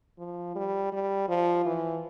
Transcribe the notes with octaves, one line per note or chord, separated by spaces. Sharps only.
F3
G3
G3
F3
E3